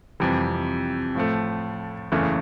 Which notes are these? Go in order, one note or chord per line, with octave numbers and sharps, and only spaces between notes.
F2 C3 E3 G3
A2 F3 A3
F#1 E2 C#3 E3 A3